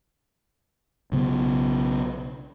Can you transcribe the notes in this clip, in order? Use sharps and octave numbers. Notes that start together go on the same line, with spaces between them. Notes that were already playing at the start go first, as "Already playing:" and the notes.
B1 C#3 B3